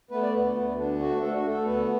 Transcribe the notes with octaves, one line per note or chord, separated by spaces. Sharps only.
A3 B3 B4
D5
D2 B3 B4
D2
D4
A3 F#4
A3 A4
F#4
A3 A4
D2 B3 B4